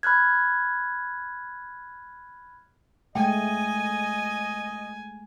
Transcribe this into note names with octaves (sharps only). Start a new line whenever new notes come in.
B5 F6 F#6 G#6
G#3 A3 D#5 G5 G#5